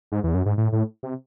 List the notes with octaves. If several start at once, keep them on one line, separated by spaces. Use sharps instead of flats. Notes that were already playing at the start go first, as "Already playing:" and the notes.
G#2
E2
F#2
G#2
A2
A2
C3